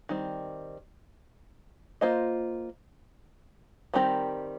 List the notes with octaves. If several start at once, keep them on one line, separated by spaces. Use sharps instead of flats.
D#3 G3 C4
A#3 F4 C5 D#5
D#3 G3 C4 G4 A#4